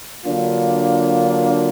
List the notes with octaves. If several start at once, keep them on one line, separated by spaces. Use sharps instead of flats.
D3 F#3 A#3 D4 F4